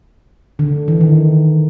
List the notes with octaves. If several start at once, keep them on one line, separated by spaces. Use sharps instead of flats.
D3
E3
D#3